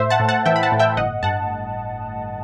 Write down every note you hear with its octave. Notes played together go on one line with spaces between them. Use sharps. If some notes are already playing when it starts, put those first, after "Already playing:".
Already playing: A2 C5 E5
F#5 A5
A2
F#5 A5
E3 E5 G5
B5
F#5 A5
A2
E5 G5
G1 D#5 F#5
G2 F#5 A5